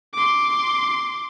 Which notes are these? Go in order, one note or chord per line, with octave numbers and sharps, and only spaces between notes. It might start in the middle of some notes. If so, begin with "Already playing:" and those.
C6 D6